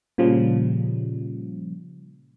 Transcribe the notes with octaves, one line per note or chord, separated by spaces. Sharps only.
A#2 C#3 F3 G3